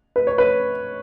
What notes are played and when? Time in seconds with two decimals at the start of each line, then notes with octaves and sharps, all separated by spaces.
0.16 B4
0.27 C#5
0.38 B4